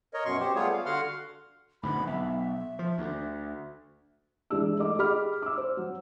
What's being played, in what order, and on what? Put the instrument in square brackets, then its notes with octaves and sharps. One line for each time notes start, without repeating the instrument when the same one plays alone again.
[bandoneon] A#4 C#5 D#5
F#2 B2 C6 C#6
G4 C5
G3 A3 B3 F4 G#4 C#5
F5
D3 F#4 F5 F#5 C6 F6
[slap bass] D2 G#2 B2 [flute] B5
[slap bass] B1 [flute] E5
[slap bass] F3
D2
[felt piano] E3 G#3 D4 E6
A3 D#5 D6
G4 G#4 D#5 B5 D6 F6
D6 E6
C5
F#3